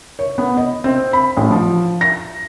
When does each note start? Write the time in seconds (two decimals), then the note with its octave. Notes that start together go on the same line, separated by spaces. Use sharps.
0.19 C#5
0.38 B3
0.57 D#5
0.84 C4
1.13 B5
1.37 A1
1.51 F3
2.01 A#6